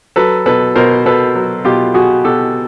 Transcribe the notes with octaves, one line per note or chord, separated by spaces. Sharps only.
F#3 A4 B4
B2 A4 B4
B2 A#4 C5
B2 A4 B4
F#3
B2 F4 G4
B2 F#4 G#4
B2 G4 A4